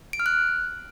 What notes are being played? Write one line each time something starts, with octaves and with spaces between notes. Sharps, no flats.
D7
F6
F#6